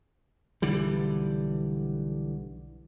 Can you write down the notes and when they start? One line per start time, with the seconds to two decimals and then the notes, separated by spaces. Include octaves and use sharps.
0.62 B1 D3 E3 G3